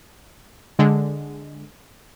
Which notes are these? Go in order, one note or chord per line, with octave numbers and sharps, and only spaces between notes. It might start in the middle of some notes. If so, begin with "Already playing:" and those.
D3 G#3